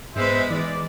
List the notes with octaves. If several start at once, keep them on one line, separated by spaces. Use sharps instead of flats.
G#2 G#3 B3 B4 C5 E5
E3 D5